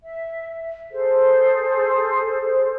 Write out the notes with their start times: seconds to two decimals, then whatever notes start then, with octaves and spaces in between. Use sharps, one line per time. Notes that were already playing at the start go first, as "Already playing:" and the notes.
0.02 E5
0.91 G#4 A4 C5